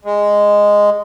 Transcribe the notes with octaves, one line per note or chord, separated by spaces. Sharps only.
G#3